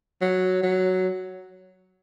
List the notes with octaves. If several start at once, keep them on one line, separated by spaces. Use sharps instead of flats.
F#3
F#3